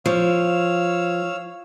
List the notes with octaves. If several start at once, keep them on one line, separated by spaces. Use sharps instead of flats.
F3 C#5 F5 E6